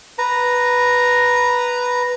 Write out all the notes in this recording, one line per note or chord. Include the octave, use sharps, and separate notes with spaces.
B4 A#5